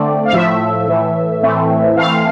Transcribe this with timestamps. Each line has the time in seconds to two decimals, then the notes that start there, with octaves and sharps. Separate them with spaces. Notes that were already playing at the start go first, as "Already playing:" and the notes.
Already playing: D3 A3 C4 D5
0.25 F5
0.33 A2 F3 A3 E5
0.87 A2 E3 A3
1.42 A2 E3 A3 C4
1.97 E3 A3 C4 F5